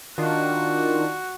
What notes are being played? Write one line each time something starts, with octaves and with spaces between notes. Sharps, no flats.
D#3 D4 F4 F#4